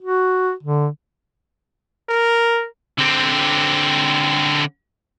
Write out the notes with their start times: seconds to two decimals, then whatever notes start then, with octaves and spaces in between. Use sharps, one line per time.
0.02 F#4
0.63 D3
2.09 A#4
2.99 D3 C4